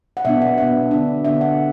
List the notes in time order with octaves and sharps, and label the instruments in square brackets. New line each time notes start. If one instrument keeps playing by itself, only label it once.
[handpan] F#5
B2 B3 D4 E5
F#5
B2 B3 D4 E5
D3 B3 D4
D3 B3 D4 E5
F#5